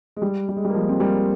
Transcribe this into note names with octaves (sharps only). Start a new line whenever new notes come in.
G#3
G3
G3
G#3
G3
A#3
F3 G#3
C4
G3 A#3